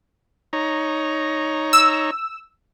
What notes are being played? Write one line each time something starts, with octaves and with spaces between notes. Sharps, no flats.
D#4 C#5 A#5
E6